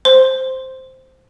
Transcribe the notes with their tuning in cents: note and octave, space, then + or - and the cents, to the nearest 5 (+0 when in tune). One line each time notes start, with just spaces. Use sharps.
C5 +0 C6 +0